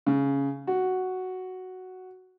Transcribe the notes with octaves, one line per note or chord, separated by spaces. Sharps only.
C#3
F#4